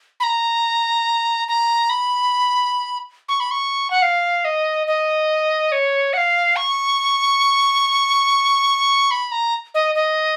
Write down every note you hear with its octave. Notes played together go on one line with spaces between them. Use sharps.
B5
A#5
A#5
B5
C#6
B5
C#6
F#5
F5
D#5
D#5
C#5
F#5
F5
C#6
B5
A#5
D#5
D#5